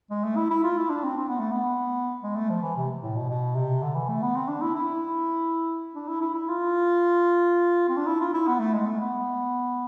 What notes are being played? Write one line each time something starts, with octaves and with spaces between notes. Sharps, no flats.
G#3
A3
E4
E4
F4
E4
D4
C4
C4
B3
A3
B3
G#3
A3
F3
E3
C3
A2
B2
B2
C3
D3
E3
A3
B3
C4
D4
E4
E4
D4
E4
E4
E4
F4
C4
D4
E4
F4
E4
B3
A3
G#3
A3
B3